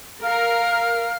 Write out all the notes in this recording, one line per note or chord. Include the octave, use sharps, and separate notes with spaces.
A#4 F5 F6